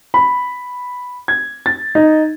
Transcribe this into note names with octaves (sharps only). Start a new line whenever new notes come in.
B5
G#6
A6
D#4